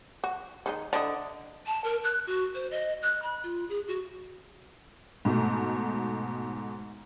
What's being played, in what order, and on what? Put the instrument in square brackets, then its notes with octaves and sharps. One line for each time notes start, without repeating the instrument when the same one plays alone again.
[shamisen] F#4
D#3 G#3 D#4
[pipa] D3 D#5 [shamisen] D4 E4
[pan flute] A5
A#4
F#6
F#4
C5
D#5
F#6
B5
F4
G#4
F#4
[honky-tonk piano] G#2 B2 A3